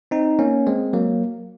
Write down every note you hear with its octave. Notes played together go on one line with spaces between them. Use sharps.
C4 D#4
A#3 C#4
G#3 C4
F#3 A#3